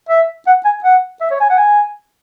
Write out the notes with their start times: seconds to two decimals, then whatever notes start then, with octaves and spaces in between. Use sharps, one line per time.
0.09 E5
0.47 F#5
0.65 G#5
0.84 F#5
1.21 E5
1.31 C#5
1.40 G#5
1.49 F#5
1.58 G#5